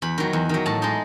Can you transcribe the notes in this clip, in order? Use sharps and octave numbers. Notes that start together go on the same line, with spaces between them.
E2 B5
D#3 F#3
E2
D#3 F#3
A2 A5
G#3 D#4